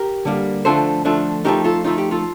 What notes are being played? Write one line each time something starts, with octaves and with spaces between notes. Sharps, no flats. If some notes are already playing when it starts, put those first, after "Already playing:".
Already playing: G4 A#4
D3 G3 A#3
D3 F3 A3 D4 F4 A4 C5
D3 F3 A3 D4 F4
F3 A3 D#4 G4 A#4
F4 A4
F3 A3 D#4 F4
G4
F4 A4